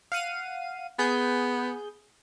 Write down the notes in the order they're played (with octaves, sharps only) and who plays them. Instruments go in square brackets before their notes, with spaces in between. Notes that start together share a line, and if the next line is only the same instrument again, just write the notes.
[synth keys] F5 F#5 D#7
[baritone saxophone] B3 [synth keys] G#4 G6